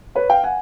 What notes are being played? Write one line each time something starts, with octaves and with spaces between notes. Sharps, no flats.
B4 C#5
F5 G5
F#5 G#5